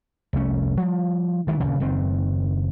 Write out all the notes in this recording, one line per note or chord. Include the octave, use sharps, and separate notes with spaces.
F1 C2 A3 C#4
F3 G3
D2 D#3 E3 G#3
D#1 D2 G2 C#3
F#1 F#2 D#3 C4